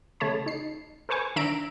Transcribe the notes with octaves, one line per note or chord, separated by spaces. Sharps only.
C#3 A3 C#5 A5 B5
D#4 C7
A4 B4 C5 G#5 C#6
D#3 D4 E5 A#5 D7